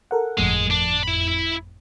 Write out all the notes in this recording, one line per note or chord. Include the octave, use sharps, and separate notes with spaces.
A4 A#4 F#5
G1 F2 A2 G#3
D4
E4 B5